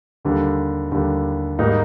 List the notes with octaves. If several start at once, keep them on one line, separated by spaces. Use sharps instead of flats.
D#2 D3 G3
D#2 D3 G3
G#2 G3 A#3 D#4